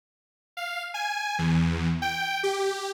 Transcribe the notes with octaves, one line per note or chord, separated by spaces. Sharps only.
F5
G#5
E2
G5
G4